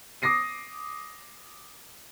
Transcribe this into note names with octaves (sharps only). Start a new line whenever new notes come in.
D6 D#6 A#6 C7 D#7